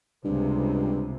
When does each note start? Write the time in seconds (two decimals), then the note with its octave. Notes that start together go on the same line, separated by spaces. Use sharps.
0.25 C#2 G2 C3